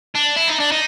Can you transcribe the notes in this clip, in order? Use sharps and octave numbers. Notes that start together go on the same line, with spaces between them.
D4
E4
D#4
D4
D#4